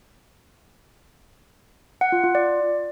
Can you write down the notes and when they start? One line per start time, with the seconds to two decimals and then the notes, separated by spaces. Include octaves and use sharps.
2.01 F#5
2.12 F4
2.24 F4
2.35 D5